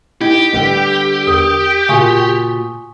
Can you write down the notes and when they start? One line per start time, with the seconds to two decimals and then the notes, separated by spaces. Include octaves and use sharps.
0.21 D#4 E4 G4 G5
0.53 A#1 D3 G3 B3
1.27 E2 A#4 D#6
1.89 A#2 C#3 F#4 G#5 C#6 D#6